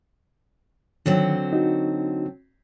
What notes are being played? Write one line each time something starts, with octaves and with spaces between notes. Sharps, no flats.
D3 D#3 F#3 C4
D#4 F#4